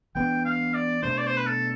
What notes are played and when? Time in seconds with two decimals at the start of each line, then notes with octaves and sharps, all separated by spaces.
0.15 E3 B3 D4 G5
0.45 F5
0.74 D5
1.02 B2 A3 D4 C5
1.18 D5
1.27 C5
1.37 B4
1.46 A4